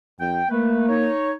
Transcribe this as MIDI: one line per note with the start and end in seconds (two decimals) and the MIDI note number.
0.21 0.42 41
0.21 0.49 79
0.51 0.87 57
0.51 1.10 58
0.51 0.87 71
0.89 1.33 63
0.89 1.33 73